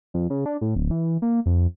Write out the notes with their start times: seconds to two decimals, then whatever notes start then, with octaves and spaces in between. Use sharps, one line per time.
0.14 F2
0.30 C#3
0.46 D4
0.61 A2
0.76 D1
0.91 E3
1.22 A#3
1.46 F2